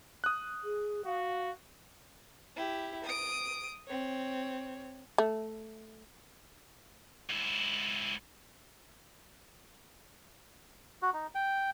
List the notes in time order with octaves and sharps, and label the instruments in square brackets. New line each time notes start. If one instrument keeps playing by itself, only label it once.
[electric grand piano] D#6 F#6
[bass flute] G#4
[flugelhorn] F#4 [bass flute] F5
[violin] E4 G4
D#6 D7
C4 C#5
[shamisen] A3
[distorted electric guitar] G#2 E4
[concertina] F#4
D#4
G5